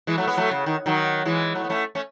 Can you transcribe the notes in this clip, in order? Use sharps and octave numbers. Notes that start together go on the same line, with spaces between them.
E3 G#3
F#3 A3
G#3 B3
F#3 A3
C#3
D#3
D#3 F#3
E3 G#3
F#3 A3
B3
A3 C#4
A3 C#4